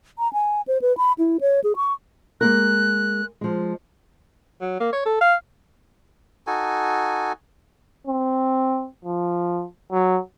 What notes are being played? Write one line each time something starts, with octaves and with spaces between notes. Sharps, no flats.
A#5
G#5
C5
B4
B5
E4
C#5
G#4
C#6
G#3 A#3 A#4 F#6
F3 G#3
F#3
A#3
C#5
A4
F5
D#4 F#4 A4 G#5
C4
F3
F#3